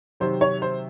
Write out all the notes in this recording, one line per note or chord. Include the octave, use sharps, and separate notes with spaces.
C3 D#3 F#3 C5
C#5
C5